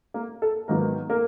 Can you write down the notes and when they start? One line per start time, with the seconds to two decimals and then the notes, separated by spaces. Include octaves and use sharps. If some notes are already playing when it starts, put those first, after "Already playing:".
0.14 A#3 A#4
0.42 A4
0.68 G#2 D#3 F#3 A#3 B3 A#4
1.10 A#3 A#4